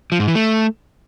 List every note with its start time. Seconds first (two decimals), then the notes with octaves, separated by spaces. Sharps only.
0.12 F3
0.20 G#2
0.27 E3
0.35 A3